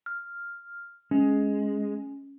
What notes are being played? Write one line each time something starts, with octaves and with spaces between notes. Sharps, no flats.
F6
G#3 C#4